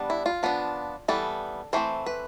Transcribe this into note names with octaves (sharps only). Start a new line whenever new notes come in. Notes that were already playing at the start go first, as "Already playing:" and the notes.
Already playing: G3 B3 D4
E4
F4
F3 B3 D4
E3 G3 B3 A4
E3 A3 C4 C5
B4